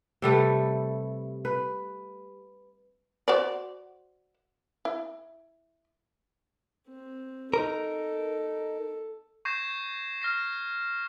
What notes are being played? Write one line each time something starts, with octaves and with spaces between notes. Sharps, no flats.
C3 G3 A3 B4
B4
F#4 C5 D5
E4
C4
D#4 A4 A#4
C#6 G6 G#6 A#6 C7 E7
F6 A#6 C7